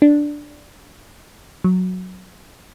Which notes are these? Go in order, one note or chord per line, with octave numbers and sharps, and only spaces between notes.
D4
F#3